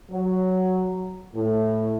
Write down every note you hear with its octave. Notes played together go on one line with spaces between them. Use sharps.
F#3
A2